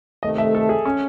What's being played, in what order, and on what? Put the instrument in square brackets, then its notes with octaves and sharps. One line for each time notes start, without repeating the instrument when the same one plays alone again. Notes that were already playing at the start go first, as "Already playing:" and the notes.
[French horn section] C3 D#3 A3 [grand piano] D#5
[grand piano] E5
A4
G#4
C#4